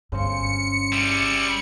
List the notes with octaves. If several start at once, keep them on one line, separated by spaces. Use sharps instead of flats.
G1 G2 C#3 C5 C#7
G3 E4